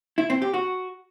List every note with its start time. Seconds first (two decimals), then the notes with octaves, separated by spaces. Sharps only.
0.18 E4
0.30 C4
0.42 G4
0.54 F#4